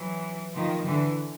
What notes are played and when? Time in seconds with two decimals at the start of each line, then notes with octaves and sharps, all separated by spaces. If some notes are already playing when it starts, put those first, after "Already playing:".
Already playing: E3 F#3
0.55 D#3 F3
0.85 D3 E3